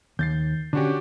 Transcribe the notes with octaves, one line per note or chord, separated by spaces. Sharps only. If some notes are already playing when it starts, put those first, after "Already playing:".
D#2 G6 A6 C7
D3 C#4 D4 F#4 G4